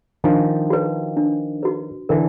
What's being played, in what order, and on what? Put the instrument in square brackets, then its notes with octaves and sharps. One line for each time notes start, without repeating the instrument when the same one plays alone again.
[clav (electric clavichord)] D#3 F3 [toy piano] D4
[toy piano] F#4 B4
D4
F#4 B4
[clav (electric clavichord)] D3 E3 [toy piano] A#4